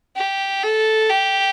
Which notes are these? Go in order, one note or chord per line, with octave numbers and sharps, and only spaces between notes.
G4
A4
G4